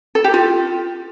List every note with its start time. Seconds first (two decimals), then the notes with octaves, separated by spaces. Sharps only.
0.15 A4
0.24 G4
0.34 F4